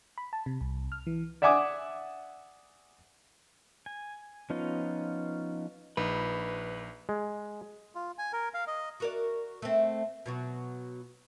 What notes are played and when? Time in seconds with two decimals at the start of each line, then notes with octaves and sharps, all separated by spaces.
0.18 B5
0.33 A5
0.46 C3
0.61 C2
0.92 F6
1.07 E3
1.42 D5 E5 F#5 G#5 D6 D#6
3.86 G#5
4.50 F3 B3 C#4 D#4 F4
5.97 A#1 D#4 B4
7.09 G#3
7.95 F4
8.18 G#5
8.33 A#4
8.54 F5
8.67 D#5
9.00 F#4 A#4 D5
9.62 A3 C4
10.26 B2 F#3 F#4